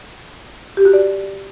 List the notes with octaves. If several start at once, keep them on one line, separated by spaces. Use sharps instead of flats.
G4
F#4
D5